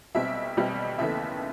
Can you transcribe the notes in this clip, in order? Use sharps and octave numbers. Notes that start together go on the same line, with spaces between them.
B1 B2 G3 C4 E5
B1 B2 G3 C4
D#2 C#3 E3 A3 E5